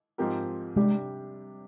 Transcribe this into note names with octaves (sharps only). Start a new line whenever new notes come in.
G#2 F3 C4 G4 A#4
C3 G3 G#3 D4 G4